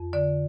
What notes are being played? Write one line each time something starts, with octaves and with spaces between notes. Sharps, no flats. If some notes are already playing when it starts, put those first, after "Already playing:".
Already playing: F2
D3 D5